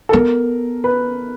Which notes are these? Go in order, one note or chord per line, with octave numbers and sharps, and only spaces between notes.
A4
B3 A#4
B4